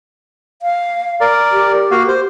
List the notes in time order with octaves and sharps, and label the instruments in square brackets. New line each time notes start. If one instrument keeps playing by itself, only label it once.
[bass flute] F5
[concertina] A#4 D5
[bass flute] G4
[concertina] A#3 F#4 F5
C5